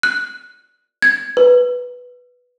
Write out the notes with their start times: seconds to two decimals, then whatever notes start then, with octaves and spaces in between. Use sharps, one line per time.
0.03 F#6
1.02 G#6
1.37 B4